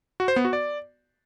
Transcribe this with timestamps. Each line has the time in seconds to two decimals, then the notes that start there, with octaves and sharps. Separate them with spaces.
0.20 F#4
0.28 C5
0.36 B3
0.45 F#4
0.53 D5